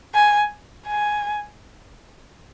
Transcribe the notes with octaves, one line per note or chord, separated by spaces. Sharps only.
G#5
G#5